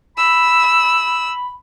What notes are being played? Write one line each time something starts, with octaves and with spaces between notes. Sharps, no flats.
B5 E6